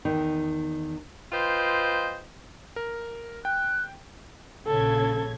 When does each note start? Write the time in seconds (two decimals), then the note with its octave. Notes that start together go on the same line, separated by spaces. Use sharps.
0.05 E2 D#3 D#4
1.33 F4 B4 C5 D#5 G5
2.76 A#4
3.45 G5 F#6
4.66 A#1 C#3 A4 G#6